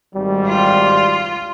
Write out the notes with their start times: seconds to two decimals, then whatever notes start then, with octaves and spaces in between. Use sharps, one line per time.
0.14 G#1 G3
0.48 F4